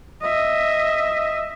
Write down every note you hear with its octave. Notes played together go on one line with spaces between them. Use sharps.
D#5 E5